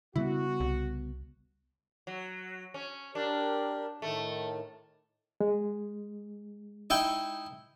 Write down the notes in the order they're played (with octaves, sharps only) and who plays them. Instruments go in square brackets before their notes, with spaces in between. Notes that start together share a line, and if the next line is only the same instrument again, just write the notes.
[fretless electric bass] C#3 G3 B3 [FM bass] E4 [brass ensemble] F#4
[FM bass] C2
[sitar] F#3
C#4
[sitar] D4 [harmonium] G4 A#4
[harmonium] A2 D#3 [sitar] A3
[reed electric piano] G#3
[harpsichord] D#4 E4 G5